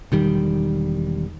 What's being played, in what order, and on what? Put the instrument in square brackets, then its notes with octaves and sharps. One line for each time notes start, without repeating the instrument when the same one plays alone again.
[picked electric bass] E1 D#3 G3